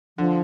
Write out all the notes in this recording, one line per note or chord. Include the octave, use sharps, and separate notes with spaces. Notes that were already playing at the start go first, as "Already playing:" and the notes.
D3 F3